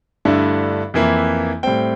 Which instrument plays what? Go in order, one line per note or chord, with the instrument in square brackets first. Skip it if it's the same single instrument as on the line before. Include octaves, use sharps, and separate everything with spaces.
[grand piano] G2 D3 A3 E4
F2 E3 A#3 E4
A2 G3 C4 G5